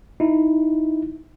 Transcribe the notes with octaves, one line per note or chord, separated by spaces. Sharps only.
D#4 E4